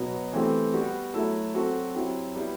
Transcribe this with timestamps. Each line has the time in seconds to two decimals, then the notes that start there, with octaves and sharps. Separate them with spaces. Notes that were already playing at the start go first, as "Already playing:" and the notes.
Already playing: B2 F#3 B3
0.33 E3 A3 C4 G4
0.74 G3 B3 F#4
1.14 F#3 A3 E4 A4
1.54 F#3 C4 F#4 A4
1.95 F#3 C4 E4 G4
2.36 G3 B3 E4